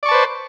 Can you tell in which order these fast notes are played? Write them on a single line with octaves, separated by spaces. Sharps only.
D5 C#6 A5 B4 C5